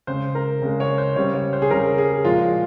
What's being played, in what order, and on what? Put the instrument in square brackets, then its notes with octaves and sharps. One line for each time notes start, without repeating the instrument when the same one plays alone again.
[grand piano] C#3 G#3 C5
A#4
C#3 G#3
C#5
C5
C#3 G3 C#5
C#5
C5
G#4
C#3 G3 A#4
G#4
A#2 F3 G#3 F4